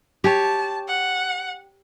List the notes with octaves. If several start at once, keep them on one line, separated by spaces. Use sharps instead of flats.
G4 C#5 A5
F#5